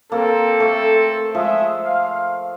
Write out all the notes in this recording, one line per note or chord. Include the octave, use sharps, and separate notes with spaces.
A#3 C4 A4
A3
F3 G#3 E5
F5